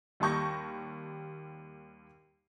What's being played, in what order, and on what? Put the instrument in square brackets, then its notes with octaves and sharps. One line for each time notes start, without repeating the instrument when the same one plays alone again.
[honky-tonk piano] D#2 G3 A5 C#6 G6 A#6